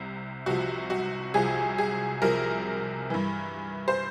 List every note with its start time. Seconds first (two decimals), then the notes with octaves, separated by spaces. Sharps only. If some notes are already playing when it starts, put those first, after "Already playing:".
Already playing: C2 C3
0.46 C2 C3 F3 F#4
0.90 F#4
1.34 C2 C3 F3 G#4
1.78 G#4
2.22 C2 C3 F3 A#4
3.10 G2 E3
3.88 C5